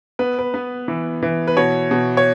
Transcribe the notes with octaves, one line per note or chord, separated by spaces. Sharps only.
B3 B4
B4
B3
E3
E3
B4
B2 C#5
B2
C#5